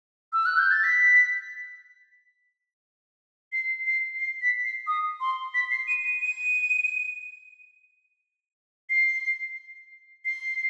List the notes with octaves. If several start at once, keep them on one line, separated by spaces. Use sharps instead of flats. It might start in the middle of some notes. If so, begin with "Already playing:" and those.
E6
F#6
G6
A6
B6
C7
C7
C7
B6
C7
D#6
C6
B6
C7
D#7
D#7
D#7
C7
C7